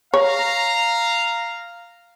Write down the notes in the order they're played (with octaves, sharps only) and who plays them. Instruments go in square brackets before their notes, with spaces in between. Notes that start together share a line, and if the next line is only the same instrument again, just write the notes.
[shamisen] C#5 [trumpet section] F5 A#5